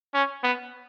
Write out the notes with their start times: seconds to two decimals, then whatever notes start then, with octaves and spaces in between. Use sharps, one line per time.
0.14 C#4
0.43 B3